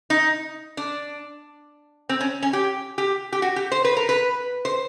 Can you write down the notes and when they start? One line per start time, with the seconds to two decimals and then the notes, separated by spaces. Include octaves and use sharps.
0.10 D#4
0.77 D4
2.09 C4
2.20 C#4
2.42 C#4
2.53 G4
2.98 G4
3.32 G4
3.42 F#4
3.56 G4
3.72 C5
3.84 B4
3.97 A#4
4.09 B4
4.65 C5